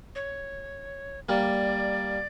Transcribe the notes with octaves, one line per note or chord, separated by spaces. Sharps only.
C#5
G3 A#3 D5